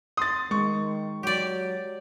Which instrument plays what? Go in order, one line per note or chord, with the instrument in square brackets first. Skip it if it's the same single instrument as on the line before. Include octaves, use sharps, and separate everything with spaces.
[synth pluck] C6 [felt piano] D#6 A6
[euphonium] D#3 [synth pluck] G#3 [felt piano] C#6
[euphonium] F#3 [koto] G4 D5